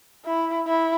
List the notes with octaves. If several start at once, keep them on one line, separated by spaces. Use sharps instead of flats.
E4
E4